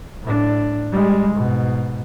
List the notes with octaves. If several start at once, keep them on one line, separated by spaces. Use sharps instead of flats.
A2 D4
G3 G#3
G#2 B2